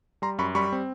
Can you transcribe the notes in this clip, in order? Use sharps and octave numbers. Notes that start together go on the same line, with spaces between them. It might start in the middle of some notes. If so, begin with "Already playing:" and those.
G3 A#5 C6
F#2 B5 C#6
G3 B5 C#6
C4